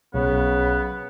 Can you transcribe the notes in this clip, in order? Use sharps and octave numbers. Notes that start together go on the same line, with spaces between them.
B1 C#3 B3